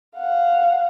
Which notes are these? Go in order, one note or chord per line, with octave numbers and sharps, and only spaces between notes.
F5 F#5